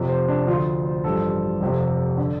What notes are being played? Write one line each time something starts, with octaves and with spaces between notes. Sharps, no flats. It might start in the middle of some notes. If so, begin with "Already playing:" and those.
Already playing: F1 F2 C3 F3
C5
D4
D2 D3 F3 F4
C5
A1 G2 F3 A4
F1 F2 C3 F3
D3